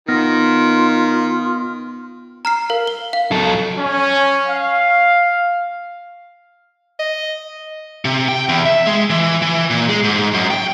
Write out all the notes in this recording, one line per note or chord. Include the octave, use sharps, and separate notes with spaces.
D#3 B3 F4 F6 A#6
A#5 F6 C7
A#4 F5
G7
F5
F#3 A4
C#4
F5
D#5
C3
G5
E2
E5
G#3
E3
E3
A#2
G#3
G#2
F#2
G5